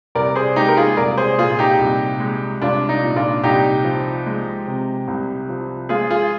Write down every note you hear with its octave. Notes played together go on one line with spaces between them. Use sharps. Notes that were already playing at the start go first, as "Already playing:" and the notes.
C2 A#4 D5
G#4 C5
G#3 D#4 G4
A#4
F4 G#4
C2 A#4 D5
G#4 C5
A#2 F4 G#4
D#4 G4
C2
G#3
C2 D4 F4
D#4
A#2
D4 F4
C2 D#4 G4
F3
G#3
C3
C2
F3
G#3 F4 G#4
F4 G#4